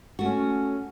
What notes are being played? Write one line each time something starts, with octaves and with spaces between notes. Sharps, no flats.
A3 C#4 F#4